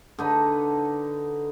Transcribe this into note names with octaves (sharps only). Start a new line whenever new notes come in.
D3 D#4 B4